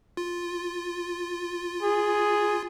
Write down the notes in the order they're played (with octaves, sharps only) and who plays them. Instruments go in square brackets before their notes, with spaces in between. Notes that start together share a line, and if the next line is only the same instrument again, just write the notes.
[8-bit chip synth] F4
[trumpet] G#4